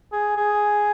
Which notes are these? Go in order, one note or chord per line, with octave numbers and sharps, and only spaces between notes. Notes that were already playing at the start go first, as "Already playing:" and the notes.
G#4
G#4